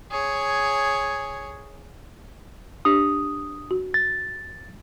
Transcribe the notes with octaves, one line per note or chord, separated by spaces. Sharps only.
G#4 C#5
D4 G4 D#6
F#4
A6